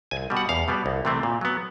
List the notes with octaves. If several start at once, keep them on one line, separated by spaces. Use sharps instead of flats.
C2 G#5
B2 G3
F#5
E2 F5
B2 G3 B3
C2
C3 E3 A3 C4
A#2
F#3 B3